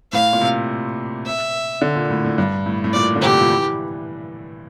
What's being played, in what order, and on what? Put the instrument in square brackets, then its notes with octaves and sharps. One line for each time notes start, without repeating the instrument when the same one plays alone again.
[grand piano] A2 [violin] F5
[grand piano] A#2
C3
[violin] E5
[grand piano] D3
A#2
A2
A2
G2
A2
A2
[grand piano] A#2 [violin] D5
[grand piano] D3
[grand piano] C3 [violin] G4
[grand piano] F3
E3